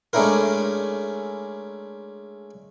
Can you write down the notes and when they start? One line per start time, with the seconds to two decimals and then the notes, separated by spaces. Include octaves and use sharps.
0.13 G#3 A3 C#4 D4 E4 A#4